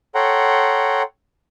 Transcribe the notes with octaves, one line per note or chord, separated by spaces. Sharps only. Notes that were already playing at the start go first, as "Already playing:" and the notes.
A4 C#5 F#5 G5 A#5 C6